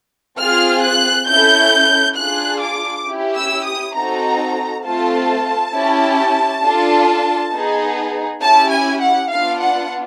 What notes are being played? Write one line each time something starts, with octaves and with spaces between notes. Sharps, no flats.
C4 F4 G#4 F6
F#6
C#4 E4 A4 G6
D4 F4 G#4 F#6
D6
C#4 E4 G4
E6
D#6
C4 D#4 F#4 A4 A#5
A3 C4 F4 A4 A5
C#4 E4 G4
D4 F4 A4
B3 D#4 G#4
C#4 E4 G4 A5
G#5
F#5
B3 D4 F4 F5
F#5